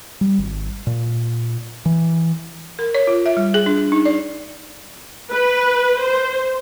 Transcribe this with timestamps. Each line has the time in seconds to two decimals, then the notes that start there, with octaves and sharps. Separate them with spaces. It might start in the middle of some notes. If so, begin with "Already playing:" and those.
0.21 G3
0.38 G#1
0.87 A#2
1.86 E3
2.79 A#4
2.95 C#5
3.07 F4
3.26 E5
3.37 G3
3.54 G#4
3.66 D4
3.92 D#4
4.05 D5
5.33 B4
6.03 C5